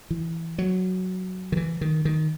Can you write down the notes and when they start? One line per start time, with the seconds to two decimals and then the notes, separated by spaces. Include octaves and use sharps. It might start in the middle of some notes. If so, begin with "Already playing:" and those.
0.10 E3
0.58 F#3
1.52 D#3
1.57 E3
1.81 D#3
2.05 D#3